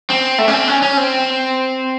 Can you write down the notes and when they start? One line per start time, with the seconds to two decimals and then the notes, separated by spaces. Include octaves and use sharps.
0.10 C4
0.38 A3
0.48 C#4
0.54 C4
0.68 C#4
0.82 C#4
0.97 C4